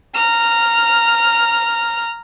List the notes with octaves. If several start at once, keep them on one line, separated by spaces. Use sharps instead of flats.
A#5 F6